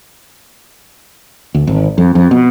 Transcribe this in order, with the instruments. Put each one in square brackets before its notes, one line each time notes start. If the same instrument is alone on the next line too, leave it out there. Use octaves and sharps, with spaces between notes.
[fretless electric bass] D2
G#1
F2
F2
B2